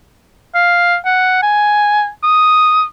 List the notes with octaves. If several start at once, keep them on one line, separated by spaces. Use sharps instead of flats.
F5
F#5
G#5
D#6